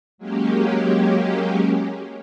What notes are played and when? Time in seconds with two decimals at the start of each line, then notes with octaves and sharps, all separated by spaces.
0.18 F#3 G#3 A#3 C#4 G4